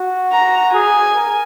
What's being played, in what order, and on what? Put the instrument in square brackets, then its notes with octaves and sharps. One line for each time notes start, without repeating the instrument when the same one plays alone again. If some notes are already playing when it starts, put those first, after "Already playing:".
Already playing: [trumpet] F#4
[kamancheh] A#5
[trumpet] G#4 [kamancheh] G#5
[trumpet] A#4